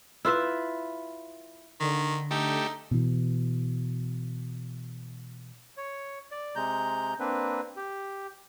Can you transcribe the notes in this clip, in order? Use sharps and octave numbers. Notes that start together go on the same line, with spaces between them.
E4 F4 B4 E5
D3 D#3
A3 D#4 G4
B2 E3
C#5
D5
C3 G#3 A#5 G6
A#3 C4 D4 B4
G4